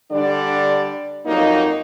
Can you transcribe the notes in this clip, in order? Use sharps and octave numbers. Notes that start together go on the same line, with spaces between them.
D3 G3 D4 D5
F2 F#3 A#3 D#4